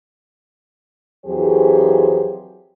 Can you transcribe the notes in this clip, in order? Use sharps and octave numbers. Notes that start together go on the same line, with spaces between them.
F2 E3 F#3 G4 G#4 C5